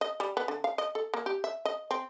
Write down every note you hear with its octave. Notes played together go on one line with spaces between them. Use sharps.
D#5
G3
B3
D3
F5
D#5
A4
A#3
G4
E5
D#5
C4